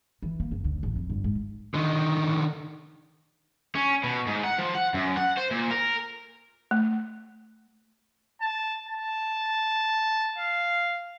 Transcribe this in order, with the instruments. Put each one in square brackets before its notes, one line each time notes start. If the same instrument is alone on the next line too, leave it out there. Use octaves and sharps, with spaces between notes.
[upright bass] E3
A#3
F#1
D2
A1
F2
G1
G#2
[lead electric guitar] D3 D#3
[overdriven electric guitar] C#4
B2
G#2
F#5
F3
F#5
F#2
F#5
C5
A#2
A#4
[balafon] A3
[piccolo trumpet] A5
A5
F5